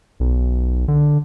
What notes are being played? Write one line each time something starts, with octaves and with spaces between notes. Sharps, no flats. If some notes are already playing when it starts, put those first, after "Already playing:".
B1
D3